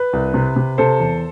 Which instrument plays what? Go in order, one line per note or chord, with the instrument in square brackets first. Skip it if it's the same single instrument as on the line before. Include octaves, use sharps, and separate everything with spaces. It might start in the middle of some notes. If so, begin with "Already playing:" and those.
Already playing: [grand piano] B4
C2
C3
C3
C3 A4 C5
E2